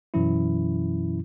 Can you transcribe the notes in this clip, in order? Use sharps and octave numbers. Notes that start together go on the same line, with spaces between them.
F#2 B2 E3 F#3 C#4 E4